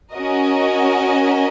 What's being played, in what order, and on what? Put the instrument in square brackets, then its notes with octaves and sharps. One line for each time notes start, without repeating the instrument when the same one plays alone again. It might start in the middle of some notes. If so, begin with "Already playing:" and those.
[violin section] C#4 F#4 A#4 D#5